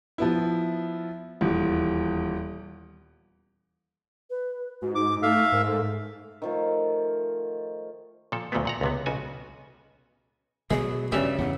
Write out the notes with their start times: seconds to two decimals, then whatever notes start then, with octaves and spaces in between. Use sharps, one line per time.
0.18 F3 B3 E4
1.41 D#1 E2
4.30 B4
4.82 G#2 F#4
4.95 D#4 D6
5.22 A3 E5 F5
5.52 G#2 A#4
5.67 A4
6.42 D#3 F3 A3
8.32 A#2 F3 A4
8.52 D2 A#2 F3 F#3 A3 B3
8.65 A#2 F#5 A#5
8.81 C#2 C3 B3
9.06 B1 C#3 F#4 G#5
10.71 B2 F#3 G#3 G#4
11.12 G2 C#3 G4 D5 E5
11.38 E2 G2 F#5